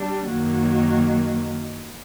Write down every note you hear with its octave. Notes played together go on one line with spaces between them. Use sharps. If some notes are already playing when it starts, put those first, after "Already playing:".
Already playing: G3 D4
F#2 D#3 F#3 A#3